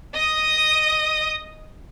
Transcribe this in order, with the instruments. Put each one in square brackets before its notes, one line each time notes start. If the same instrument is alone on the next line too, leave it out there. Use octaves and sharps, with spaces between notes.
[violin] D#5 D#6